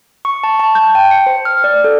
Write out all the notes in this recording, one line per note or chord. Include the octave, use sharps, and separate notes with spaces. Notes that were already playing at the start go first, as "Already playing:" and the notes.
C#6
A5
A5
G6
G5
C#7
C5
F6
D5
A4